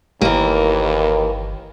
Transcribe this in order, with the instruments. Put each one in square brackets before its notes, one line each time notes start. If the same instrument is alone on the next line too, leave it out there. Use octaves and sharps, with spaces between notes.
[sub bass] G1 [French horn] D#2 [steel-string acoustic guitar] E3 A#3